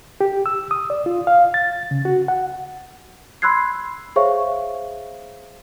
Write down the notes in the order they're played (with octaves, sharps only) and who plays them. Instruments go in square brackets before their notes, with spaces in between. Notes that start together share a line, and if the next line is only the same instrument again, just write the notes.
[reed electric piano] G4
E6
D#6
D5
F4
F5
A6
C#3
F#4
F#5
[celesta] B5 C6 E6 F#6 G#6 C7
G#4 C5 C#5 E5 F5 C#6